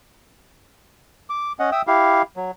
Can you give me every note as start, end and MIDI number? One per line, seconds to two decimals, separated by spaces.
1.30 1.52 86
1.59 1.70 61
1.59 1.70 75
1.59 1.70 78
1.72 1.82 76
1.72 1.82 79
1.72 1.82 87
1.72 1.82 88
1.87 2.22 64
1.87 2.22 67
1.87 2.22 77
2.37 2.51 54